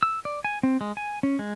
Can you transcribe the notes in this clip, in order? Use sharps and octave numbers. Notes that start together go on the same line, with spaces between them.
E6
D5
G#5
C4
G#3
G#5
C#4
G#3